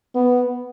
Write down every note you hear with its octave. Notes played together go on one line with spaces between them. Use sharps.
B3